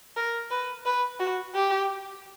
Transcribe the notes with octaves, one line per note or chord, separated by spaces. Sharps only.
A#4
B4
B4
F#4
G4